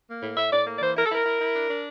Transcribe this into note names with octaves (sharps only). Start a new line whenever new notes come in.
A#3
A2
A2 E5
A2 D5
A#3
D5
E3 C5
E4 A#4
A4
E4 A#4
E4
E4
D4
D4